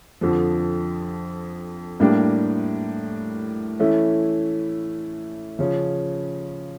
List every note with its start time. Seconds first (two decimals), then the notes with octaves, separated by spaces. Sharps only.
0.21 F2 D3 F3
2.00 A2 G3 A#3 D4
3.80 E3 A3 C#4 E4
5.59 C#3 F3 C#4